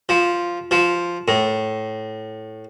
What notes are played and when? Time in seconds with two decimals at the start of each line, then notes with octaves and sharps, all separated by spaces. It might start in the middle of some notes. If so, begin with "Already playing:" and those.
0.09 F3
0.71 F3
1.28 A2